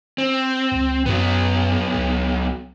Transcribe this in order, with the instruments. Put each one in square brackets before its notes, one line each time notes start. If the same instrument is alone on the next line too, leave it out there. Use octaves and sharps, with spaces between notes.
[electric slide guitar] C4
[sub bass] C#2
[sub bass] F#2 [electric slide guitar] F#3 B3
[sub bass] C#2